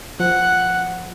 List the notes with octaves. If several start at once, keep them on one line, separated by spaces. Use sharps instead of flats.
F3 F#5